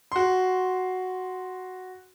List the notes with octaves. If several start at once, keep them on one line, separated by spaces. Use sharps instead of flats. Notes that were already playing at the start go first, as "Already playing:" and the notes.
F#4 C6